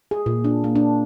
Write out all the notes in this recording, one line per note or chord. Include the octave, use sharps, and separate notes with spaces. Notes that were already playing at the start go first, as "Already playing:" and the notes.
G#4
A#2
D4
A#3
D4